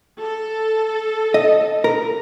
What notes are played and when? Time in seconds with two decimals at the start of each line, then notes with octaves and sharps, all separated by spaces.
0.21 A4
1.34 D#5
1.84 A#4